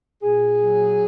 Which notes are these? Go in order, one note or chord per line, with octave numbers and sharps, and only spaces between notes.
A#2 G#4
F#3